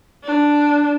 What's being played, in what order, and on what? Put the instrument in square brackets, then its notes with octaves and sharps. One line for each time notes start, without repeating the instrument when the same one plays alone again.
[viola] D4